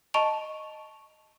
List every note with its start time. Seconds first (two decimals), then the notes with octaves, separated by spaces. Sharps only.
0.14 D#5 A5 A#5 C#6 D7 F7